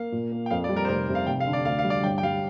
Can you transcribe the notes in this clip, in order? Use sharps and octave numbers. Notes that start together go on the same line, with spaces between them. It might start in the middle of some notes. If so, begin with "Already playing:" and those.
Already playing: A#3 F5
A#2
A#3
G5
F2 F5
D5
G3
A#4
C5
F1 A#4
C3
F5
F1 G5
F5
D3
D5
D2 F5
F5
G3
D5
G1 G5
G5
G3 F5